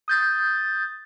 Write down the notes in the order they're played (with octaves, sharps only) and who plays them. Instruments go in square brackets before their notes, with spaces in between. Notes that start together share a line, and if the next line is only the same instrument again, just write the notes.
[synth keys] D#6 G6 A6